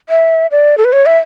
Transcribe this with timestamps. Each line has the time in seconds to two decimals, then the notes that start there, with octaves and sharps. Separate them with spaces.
0.09 E5
0.51 D5
0.78 A4
0.85 B4
0.93 C#5
1.06 E5